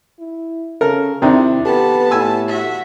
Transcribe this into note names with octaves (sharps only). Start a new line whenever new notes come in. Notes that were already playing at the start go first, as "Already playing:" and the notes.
E4
C#3 A4 A#4
D#2 C3 D#3 C4 D4 E4
B3 G4 A4 B4 A5
A2 G#5 E6
F#4 E5